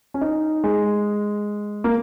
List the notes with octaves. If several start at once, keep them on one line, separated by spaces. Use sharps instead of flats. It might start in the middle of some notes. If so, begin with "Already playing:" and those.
C#4
D#4
G#3
A#3